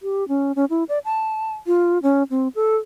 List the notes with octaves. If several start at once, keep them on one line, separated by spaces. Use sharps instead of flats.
G4
C#4
C#4
E4
D5
A5
F4
C#4
C4
A4